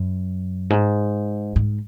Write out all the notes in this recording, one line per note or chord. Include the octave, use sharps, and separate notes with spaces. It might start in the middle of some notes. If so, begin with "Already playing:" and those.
Already playing: F#2
G#2
G#2